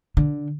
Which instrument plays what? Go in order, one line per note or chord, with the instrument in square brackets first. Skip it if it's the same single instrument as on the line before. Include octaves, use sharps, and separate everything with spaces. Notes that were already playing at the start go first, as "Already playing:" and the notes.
[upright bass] D3